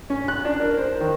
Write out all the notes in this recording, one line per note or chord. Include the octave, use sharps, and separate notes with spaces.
C#4
F#6
D4
A#4
C5
D#3